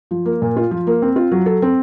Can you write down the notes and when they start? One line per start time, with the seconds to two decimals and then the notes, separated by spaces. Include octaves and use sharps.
0.11 F3
0.25 A#3
0.42 A#2
0.56 F4
0.71 F3
0.87 A#3
1.02 C4
1.16 F4
1.31 F#3
1.46 A4
1.62 C4